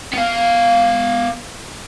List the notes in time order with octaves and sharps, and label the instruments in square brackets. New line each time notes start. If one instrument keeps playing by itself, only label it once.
[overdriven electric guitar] B3 F5